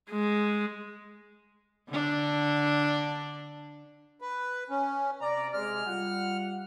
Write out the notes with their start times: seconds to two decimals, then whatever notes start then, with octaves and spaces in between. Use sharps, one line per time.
0.10 G#3
1.89 D3 D4
4.21 B4
4.70 C#4
5.21 C3 D5 A#5
5.53 C3 G#3 F6
5.86 G3 F4 F#5